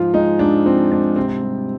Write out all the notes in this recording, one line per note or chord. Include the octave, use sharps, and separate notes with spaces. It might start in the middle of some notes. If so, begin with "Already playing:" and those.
Already playing: G#2 F3 F4
G#3 D#4
G#2 D4
F3 C4
G#2 D4
C3 C4
G3